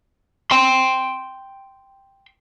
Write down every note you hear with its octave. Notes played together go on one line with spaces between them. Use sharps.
G5 C6